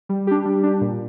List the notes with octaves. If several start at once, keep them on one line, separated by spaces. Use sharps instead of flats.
G3
D4 G4
G3
D4 G4
A#2